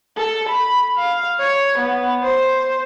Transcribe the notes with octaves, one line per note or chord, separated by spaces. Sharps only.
A4
B5
F5
C#5
B3
C5